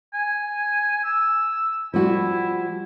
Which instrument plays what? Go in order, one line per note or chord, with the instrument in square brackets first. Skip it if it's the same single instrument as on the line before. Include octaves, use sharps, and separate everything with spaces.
[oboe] G#5
E6
[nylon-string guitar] F3 G3 F#4 [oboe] E4